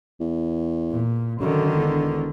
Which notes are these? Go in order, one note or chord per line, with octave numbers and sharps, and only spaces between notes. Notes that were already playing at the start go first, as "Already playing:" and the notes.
E2
A#2
F#2 D3 D#3
E1